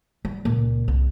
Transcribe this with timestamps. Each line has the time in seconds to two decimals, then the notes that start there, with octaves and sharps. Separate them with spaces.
0.25 G3
0.45 C#2 A#2
0.88 C2